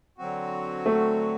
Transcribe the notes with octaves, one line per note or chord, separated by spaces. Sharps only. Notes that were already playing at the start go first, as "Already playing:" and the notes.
D3 F#3 C4 F#4
A3